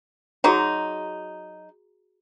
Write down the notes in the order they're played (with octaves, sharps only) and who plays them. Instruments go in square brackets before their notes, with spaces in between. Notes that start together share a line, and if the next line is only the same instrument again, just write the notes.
[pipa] F#3 D#4 [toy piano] F#4 G#4 A#5